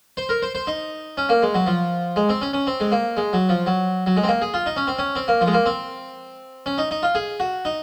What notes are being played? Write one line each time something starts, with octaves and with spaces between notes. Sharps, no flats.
C5
A#4
C5
C5
D#4
C#4
A#3
G#3
F#3
F3
G#3
C4
C#4
C#4
C4
G#3
A#3
G#3
F#3
F3
F#3
F#3
G#3
C4
A#3
G#4
F4
D#4
C#4
C4
C#4
C4
A#3
F3
G#3
A#3
C4
C#4
D#4
D#4
F4
G#4
F#4
D#4